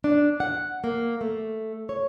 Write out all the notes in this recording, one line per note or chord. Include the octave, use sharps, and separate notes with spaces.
D4
F#5
A#3
A3
C#5